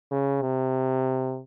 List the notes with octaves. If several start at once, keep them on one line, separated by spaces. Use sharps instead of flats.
C#3
C3